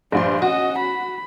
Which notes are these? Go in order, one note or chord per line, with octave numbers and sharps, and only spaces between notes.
A#1 G2 C5 D5 C6
C#4 F#4 D#5
B5